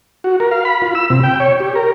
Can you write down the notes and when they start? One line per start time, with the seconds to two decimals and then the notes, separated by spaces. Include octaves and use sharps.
0.24 F#4
0.40 A#4
0.51 F5
0.65 B5
0.82 F4
0.95 E6
1.10 C3
1.23 G5
1.40 C#5
1.60 G4
1.75 A#4